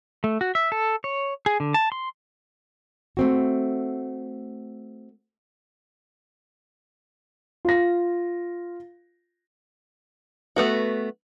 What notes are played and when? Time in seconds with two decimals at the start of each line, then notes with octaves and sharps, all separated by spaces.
0.24 A3
0.41 F#4
0.55 E5
0.72 A4
1.04 C#5
1.46 G#4
1.60 D3
1.74 A5
1.92 C6
3.17 A3 C4 F#4
7.65 F4 A#6
10.56 A3 B3 F#4